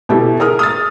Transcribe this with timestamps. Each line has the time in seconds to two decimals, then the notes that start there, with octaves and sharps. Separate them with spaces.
0.09 B2 E4 G4 A4
0.40 G#4 A#4 D#6 F6
0.59 D#6 F6 A6